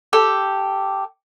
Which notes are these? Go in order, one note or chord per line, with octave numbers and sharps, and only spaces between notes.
G4 A4 G5